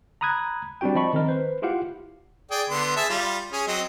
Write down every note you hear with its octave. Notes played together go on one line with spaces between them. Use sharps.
A#5 B5 D#6 F#6 G#6
G3 C4 D4 F#4 G5
F3 D#5 A5 B5 C#6
D#3 C4 A#4 D#5
B4 C5
E4 F4 G4 F5 F#5
G#4 D5 G5
D3 B3 C6
G#4 E5 A5
G3 F4
C#4 G#4
F#3 C4 D#5